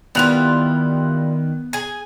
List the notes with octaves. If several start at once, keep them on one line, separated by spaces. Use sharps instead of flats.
D#3 G3 B3 E4 F4 F#6 F7
G#4 G#5